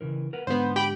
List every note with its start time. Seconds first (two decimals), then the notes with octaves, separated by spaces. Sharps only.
0.01 C#3 E3 A#4
0.33 A#4 B4 F#5
0.47 G#2 D3 B3 C5
0.76 G4 G5 B5